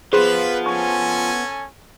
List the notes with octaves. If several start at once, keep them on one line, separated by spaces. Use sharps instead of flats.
F3 B3 F4 G#4 B4 C5
C#4 A4 G#5 C#6